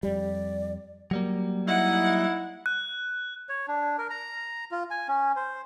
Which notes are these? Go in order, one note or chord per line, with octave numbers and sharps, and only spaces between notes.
F2 G3 D5
F#3 G3 A#3
D#4 E4 F#5
F#6
C#5
D4
A#4
A#5
F4
G#5
C#4
C5